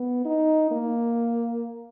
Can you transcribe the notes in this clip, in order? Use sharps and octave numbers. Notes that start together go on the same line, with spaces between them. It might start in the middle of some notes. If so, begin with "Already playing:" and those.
Already playing: B3
D#4
A#3